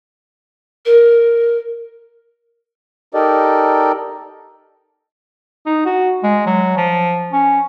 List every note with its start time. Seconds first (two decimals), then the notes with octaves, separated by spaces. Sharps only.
0.85 A#4
3.14 D#4 G4 A4 A#4 D5 D#5
5.66 D#4
5.85 F#4
6.23 G#3
6.46 F#3
6.77 F3
7.32 C#4